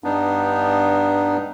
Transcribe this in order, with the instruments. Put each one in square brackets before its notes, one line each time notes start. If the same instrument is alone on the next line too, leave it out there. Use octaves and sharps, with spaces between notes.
[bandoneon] G2 B3 D4 D#4